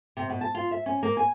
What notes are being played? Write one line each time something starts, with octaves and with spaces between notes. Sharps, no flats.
C3
B2
A5
F4
E5
C#4
A#3
G#5